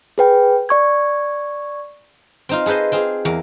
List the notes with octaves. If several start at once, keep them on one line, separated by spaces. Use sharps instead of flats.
G#4 B4 G5
D5 C#6 G#6
C4 D#4 F4
G#4 A4 B4 C5 D#5
C4 F4 G#4
E2 A#3